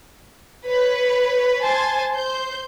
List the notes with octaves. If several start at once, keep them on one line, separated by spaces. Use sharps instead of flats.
B4 C#5
C5 G#5 A5
C5 G6